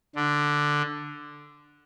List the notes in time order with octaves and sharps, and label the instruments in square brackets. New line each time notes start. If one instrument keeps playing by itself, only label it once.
[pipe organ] D3